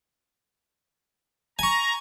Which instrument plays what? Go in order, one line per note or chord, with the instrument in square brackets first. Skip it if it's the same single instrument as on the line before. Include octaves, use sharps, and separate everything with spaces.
[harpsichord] G#5 C#6 [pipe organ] A#5